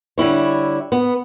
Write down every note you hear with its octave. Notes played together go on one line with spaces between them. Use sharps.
D3 G3 E4 C#5
B3